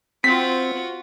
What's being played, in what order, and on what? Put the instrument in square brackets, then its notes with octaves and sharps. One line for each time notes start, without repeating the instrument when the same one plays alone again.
[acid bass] C4 [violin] F4 F#4 [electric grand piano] B6